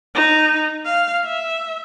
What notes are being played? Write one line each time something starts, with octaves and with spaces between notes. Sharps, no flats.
D#4
F5
E5